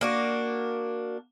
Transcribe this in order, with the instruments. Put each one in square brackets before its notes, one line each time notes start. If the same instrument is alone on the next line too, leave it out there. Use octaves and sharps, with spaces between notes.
[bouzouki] A#3 D4 F#4